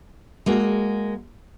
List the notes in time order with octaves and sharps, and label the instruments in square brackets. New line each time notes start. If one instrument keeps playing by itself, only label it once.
[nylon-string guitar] G#3 A#3 F#4